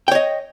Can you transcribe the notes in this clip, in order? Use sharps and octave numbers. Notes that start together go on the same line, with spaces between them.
C#5 D#5 G5